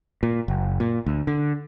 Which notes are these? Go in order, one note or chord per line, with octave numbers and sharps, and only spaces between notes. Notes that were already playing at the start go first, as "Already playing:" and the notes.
A#2
F#1
A#2
D2
D3